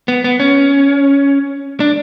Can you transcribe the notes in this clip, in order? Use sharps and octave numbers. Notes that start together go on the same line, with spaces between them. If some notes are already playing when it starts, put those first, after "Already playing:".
B3
B3
C#4
D4